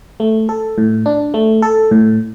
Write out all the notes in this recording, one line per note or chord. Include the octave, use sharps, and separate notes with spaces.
A3
A4
A2
D4
A3
A4
A2